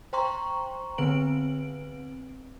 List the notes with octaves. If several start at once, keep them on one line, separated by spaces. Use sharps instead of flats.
C5 G5 A#5 C6 C#6
D3 B3 C4 B4 D7 F#7